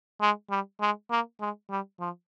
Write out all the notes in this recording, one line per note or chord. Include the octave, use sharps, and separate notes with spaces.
G#3
G3
G#3
A#3
G#3
G3
F3